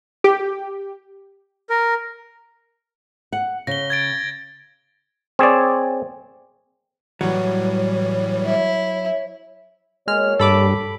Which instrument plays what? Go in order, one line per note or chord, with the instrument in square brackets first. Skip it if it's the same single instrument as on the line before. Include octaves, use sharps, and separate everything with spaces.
[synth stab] G4
[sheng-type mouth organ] A#4
[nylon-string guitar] F#5
[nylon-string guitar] C#3 [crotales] A#6 G7
[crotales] G#6 A6 D7
[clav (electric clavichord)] C4 G#4 C#5 D5
[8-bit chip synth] A2 E3 G3 [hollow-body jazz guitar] F#3 [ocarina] C#5
[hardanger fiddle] E4
[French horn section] B2 A#3 C#5 [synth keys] G#3 F6
[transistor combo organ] G2 [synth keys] A4 B5 D6